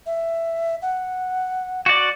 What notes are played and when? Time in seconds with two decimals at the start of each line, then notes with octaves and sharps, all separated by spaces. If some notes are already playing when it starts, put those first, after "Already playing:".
0.06 E5
0.82 F#5
1.86 F#4 D5